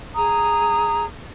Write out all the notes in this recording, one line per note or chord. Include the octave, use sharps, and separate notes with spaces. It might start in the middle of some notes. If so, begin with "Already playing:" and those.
G#4 A#5 D#6